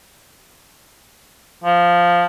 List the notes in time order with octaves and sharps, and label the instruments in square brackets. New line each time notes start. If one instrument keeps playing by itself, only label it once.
[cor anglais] F3